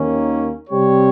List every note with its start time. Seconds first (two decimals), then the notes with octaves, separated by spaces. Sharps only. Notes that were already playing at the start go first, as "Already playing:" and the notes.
Already playing: D#2 D#3 A#3 C#4
0.70 C3 G3 C4 G4 C#5